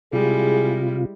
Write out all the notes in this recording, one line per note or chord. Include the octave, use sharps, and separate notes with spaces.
C3 G3 G#3 E4 F4 G#4